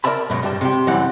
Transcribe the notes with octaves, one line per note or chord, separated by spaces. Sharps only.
A#4 D5 E5 A5 B5
F#2 B2 G#3
G2 G3 A5
C3 G4
F#2 E3 G3 C4 F#5